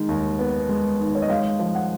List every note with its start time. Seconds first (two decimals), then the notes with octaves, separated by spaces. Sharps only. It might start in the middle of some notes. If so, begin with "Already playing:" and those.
Already playing: D#3 G#3
0.09 D#2
0.39 B3
0.69 G#3
1.00 D#3
1.15 C#5
1.22 D#5
1.29 G#3 F5
1.59 F3
1.75 F#5